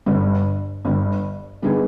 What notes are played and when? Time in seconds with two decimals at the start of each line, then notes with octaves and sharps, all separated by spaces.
0.06 G1 G2 D3 G3
0.85 G1 G2 D3 G3
1.62 D3 G3 B3 D#4 G#4